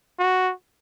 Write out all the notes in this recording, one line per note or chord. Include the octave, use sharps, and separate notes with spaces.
F#4